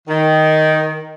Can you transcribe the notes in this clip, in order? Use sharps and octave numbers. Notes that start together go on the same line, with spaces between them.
D#3